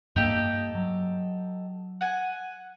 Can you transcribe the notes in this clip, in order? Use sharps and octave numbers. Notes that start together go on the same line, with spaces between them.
G2 A#3 D#4 G4 A4
F#3
F#5 G#5